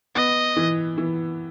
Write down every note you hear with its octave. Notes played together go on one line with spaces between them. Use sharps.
B3 D#5
E3
E3